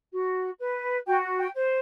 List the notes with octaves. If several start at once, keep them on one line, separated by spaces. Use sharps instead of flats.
F#4
B4
F#4 G5
G5
C5